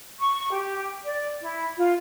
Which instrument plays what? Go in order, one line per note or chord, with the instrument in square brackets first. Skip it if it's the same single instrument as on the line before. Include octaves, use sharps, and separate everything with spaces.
[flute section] C#6
G4
D5
E4
F4